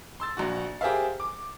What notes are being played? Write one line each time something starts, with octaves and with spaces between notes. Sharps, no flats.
C6 E6 A6
A#1 F#4
G4 G#4 A#4 C5 E5 F5
D6